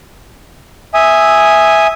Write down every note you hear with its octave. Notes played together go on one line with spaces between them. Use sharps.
E5 G#5 D#6